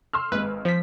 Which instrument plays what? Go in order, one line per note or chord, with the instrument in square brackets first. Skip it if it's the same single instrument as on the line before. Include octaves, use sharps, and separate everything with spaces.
[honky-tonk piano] C6 E6 F6
[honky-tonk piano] G#1 G#3 [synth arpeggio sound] B4
[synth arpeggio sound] F3 B6